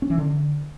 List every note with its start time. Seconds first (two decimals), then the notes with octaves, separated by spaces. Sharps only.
0.02 C#4
0.10 E3
0.18 D3